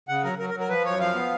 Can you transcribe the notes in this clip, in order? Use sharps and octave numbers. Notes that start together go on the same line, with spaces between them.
C#3 F#5
F#3 A#4
F#3 A#4
A#4
F#3
A#4
F3 B4
F#2 C#5
F3 F5
B3